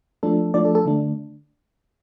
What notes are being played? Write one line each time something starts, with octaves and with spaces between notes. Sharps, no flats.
F3 A3 D4 A4
F3 A3 D4 D5
A4
A4
D3 A3 D4